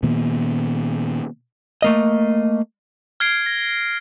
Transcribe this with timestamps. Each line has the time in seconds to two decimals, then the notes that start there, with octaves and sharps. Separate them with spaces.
0.03 A#2 D#3 A#3 B3
1.82 A3 A#3 D#5
3.20 F6 G#6 C7 D7
3.46 A#6